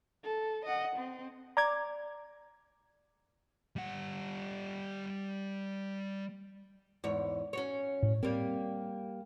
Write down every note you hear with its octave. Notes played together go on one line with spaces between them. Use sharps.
A4
D#5 F#5
C4
D5 A#5 D6 G#6
G3 F#5
E2 G#2 C#5
C#4 F#4 C#5
A2
G3 A#3 C4